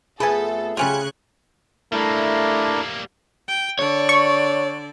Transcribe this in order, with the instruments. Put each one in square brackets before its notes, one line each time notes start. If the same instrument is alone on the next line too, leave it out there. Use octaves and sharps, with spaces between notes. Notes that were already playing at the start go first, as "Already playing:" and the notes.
[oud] F2 A3 B3 [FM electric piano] G#4 [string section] A4 [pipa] B4 G#5
[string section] C#3 F#6 G#6 [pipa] G3 C#4 F4 [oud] G4
[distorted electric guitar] G3 A#3 [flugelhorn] A3 [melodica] D4 A#4 [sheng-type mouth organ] E4
[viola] G5
[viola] D3 D5 [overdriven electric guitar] C#5
[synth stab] C#6